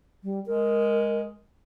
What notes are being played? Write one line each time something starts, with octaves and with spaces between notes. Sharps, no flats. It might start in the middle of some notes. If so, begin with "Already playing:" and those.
G3
G#3 A#4